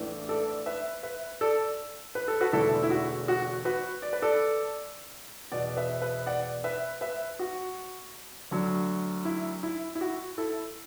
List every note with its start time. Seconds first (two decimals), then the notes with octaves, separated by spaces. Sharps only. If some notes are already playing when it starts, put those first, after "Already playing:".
Already playing: A1 A2 E3 A3 D4
0.29 A4 D5
0.66 B4 E5
1.03 B4 E5
1.41 A4 D5
2.15 B4
2.28 A4
2.41 F#4 B4
2.53 E1 E2 D3 A3 E4 A4
2.83 E4
2.90 F#4
3.28 F#4
3.65 F#4 B4
4.02 D5
4.13 B4
4.22 A4 D5
5.52 E2 B2 B3 D5 F#5
5.77 B4 E5
6.02 B4 E5
6.26 D5 F#5
6.64 B4 E5
7.01 B4 E5
7.39 F#4
8.51 D2 D3 F#3
9.25 E4
9.63 E4
9.95 E4
10.01 F#4
10.38 E4 A4